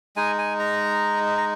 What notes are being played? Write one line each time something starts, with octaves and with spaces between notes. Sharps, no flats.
G#3 D#4 G#5
G#5
A#5
A#5